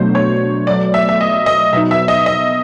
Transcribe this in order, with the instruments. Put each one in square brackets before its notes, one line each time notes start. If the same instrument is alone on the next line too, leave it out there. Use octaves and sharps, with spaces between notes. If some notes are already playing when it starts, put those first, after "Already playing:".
Already playing: [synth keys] B2 F#3 A3 D4 [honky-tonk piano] C5
[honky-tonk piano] C#5
[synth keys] B2 F#3 A3 [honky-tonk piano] D5
[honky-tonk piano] E5
E5
D#5
D#5
[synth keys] B2 F#3 B3 D#4 [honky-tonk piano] E5
[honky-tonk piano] E5
D#5
D#5